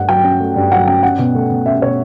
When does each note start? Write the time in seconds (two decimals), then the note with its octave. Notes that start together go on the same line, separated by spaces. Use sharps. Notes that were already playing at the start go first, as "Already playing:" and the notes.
Already playing: G2 A3 F#5
0.09 F#3 G5
0.24 C#4
0.40 A3
0.56 G2
0.72 F#3 F#5
0.87 C#4 G5
1.03 C#4 F#5
1.18 B2
1.35 A3
1.51 B2
1.66 C#4 E5
1.82 B2 C#5